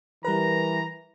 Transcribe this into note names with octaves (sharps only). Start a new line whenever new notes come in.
E3 G3 A#4 B4 A#5